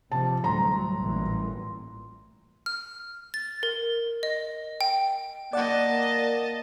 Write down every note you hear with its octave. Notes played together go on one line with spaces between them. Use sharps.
C3 F3 A5
D2 A2 F#3 G3 A#5 C6
A1 A#2 E3
F6
A6
A#4
D#5
G5
A#3 D5 D#5 F#5 A5